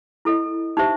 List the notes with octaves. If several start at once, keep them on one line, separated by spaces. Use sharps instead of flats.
E4 A4 D#5
D#4 G4 C5 E5